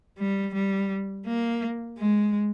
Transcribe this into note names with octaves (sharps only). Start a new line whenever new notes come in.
G3
G3
A#3
G#3